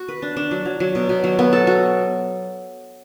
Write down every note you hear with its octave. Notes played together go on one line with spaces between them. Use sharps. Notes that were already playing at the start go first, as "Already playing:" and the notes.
Already playing: F#4
B4
D4
D4
F#3
F#3
F#3
B2
B2
F#3
B3
A4
F#4